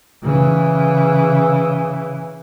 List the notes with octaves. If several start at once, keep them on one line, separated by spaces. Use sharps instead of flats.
C#3 E3